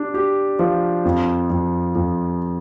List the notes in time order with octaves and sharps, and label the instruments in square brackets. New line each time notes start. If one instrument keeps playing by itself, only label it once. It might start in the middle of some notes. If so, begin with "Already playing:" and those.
Already playing: [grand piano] D4 G4
G4
F3
F2
F2
F2